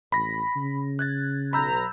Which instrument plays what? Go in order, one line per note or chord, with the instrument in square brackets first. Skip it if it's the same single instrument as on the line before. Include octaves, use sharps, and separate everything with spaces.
[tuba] A1 [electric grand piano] B5 A#6
[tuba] C#3
[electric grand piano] F#6 G#6 A6
[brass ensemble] B1 A#5 [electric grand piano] B5 E6 G6